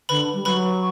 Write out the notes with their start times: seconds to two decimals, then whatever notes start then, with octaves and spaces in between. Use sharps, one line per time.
0.09 D3 B4 B5
0.34 G3
0.45 F#3 B4 B5